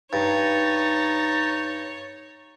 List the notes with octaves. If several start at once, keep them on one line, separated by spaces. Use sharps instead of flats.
G2 D#4 C#5 A6